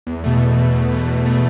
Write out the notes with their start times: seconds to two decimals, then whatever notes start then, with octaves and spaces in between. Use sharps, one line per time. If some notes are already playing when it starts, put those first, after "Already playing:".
0.07 E2
0.24 B2 A3
0.41 E2
0.58 B2 A3
0.74 E2
0.92 B2 A3
1.08 E2
1.26 B2 A3